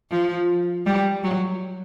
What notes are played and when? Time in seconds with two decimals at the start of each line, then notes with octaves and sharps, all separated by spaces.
0.11 F3
0.86 G3
1.24 F#3